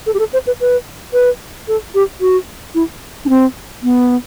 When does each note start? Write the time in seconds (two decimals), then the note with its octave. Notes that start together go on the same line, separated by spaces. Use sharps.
0.06 A4
0.14 G4
0.19 A4
0.33 C5
0.47 B4
0.60 B4
1.13 B4
1.68 A4
1.95 G4
2.21 F#4
2.75 E4
3.25 D4
3.29 C4
3.83 B3